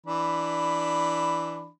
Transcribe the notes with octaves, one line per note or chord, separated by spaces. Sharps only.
E3 D4 B5